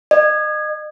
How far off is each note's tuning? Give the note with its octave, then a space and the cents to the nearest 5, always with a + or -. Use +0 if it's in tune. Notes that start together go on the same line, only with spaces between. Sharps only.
D#5 -35